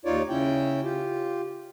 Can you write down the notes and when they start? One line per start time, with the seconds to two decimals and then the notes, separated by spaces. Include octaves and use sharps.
0.05 D#2 D#4 F4 C#5 D5
0.29 C#3 C#4 E4 G5
0.83 F4 G4